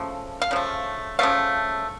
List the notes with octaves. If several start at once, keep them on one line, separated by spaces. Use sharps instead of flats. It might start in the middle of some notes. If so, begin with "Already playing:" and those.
Already playing: C#3 F3 A3
F5
C#3 F3 A3
C#3 F3 A3 F5